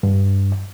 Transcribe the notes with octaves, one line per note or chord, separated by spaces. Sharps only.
G2